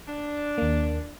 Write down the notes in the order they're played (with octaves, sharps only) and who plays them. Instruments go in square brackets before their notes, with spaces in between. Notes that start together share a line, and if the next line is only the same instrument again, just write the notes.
[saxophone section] D4
[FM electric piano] D#2 A#3